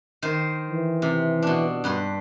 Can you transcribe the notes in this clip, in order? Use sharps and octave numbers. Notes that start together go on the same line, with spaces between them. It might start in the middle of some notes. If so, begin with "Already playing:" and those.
D#3 C5
E3
C3
B2 D4
G2 B4 C6